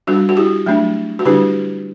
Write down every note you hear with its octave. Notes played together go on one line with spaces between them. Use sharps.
G3 D4 F#4
F#4
E4 G4
F#3 A3 D4
F#4
D3 G3 D4 E4 G4